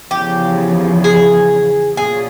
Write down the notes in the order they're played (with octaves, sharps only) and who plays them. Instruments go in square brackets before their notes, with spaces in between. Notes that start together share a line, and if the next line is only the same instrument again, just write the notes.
[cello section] E2 C#3 F3 [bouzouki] G4
[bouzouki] G#4
[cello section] A#2 F#3 A3 C#4 F4 [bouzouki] G#4